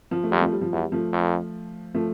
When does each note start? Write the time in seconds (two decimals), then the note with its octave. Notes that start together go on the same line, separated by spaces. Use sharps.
0.11 F3
0.23 A3
0.31 F2 G3
0.41 F3 A3
0.52 G3
0.61 F3
0.72 E2 G3
0.92 F3 A3
1.13 F2
1.95 F3 A3